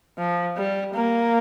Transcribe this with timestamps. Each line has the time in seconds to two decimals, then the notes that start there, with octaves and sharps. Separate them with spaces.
0.18 F3
0.57 G3
0.94 A#3